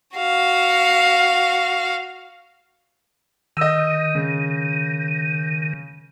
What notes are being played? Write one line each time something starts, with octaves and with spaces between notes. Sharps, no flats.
F#4 F5
D#3 D#5 E6
C#3